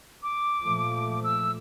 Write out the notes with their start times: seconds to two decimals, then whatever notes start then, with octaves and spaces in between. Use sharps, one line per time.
0.23 D6
0.62 A#2 F3 A3
1.24 E6